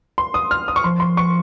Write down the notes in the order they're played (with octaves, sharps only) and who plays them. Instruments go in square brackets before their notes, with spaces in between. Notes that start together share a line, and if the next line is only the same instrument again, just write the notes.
[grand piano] C6
D#6
F6
D#6
C#6
[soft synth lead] F3 [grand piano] C6
[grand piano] C6
C#6